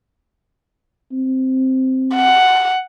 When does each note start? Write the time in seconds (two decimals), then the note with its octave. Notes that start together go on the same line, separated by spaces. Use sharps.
1.12 C4
2.15 F#5